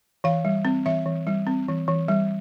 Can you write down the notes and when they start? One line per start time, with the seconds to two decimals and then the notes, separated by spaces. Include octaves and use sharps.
0.24 E3 F5
0.45 G3
0.65 C4
0.86 E3 E5
1.06 E3
1.27 G3
1.47 C4
1.68 E3
1.88 E3
2.08 G3